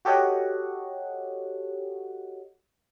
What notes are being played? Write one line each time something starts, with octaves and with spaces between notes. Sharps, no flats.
F#4 G4 A4 C#5 D#5 F#5